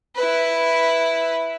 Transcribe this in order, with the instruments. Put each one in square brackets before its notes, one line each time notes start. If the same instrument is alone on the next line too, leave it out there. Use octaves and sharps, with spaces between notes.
[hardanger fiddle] E4 B4